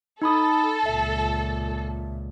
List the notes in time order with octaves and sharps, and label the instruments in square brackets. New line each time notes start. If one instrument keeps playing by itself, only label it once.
[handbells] D#4 B5 D#6 [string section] A4
[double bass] C#2 A#2 [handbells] E5